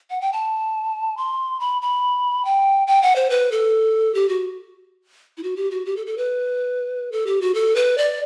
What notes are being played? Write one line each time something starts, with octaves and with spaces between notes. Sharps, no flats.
F#5
G5
A5
C6
B5
B5
G5
G5
F#5
C5
B4
A4
G4
F#4
E4
F#4
G4
F#4
G4
A4
A4
B4
A4
G4
F#4
A4
B4
D5